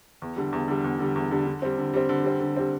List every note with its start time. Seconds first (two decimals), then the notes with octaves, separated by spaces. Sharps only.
0.22 E2
0.36 D3 G3
0.52 E2
0.68 D3 G3
0.84 E2
0.99 D3 G3
1.15 E2
1.31 D3 G3
1.47 D3
1.62 G3 C4
1.78 D3
1.94 G3 C4
2.09 D3
2.24 G3 C4
2.40 D3
2.56 G3 C4